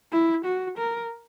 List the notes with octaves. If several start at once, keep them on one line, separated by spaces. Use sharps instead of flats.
E4
F#4
A#4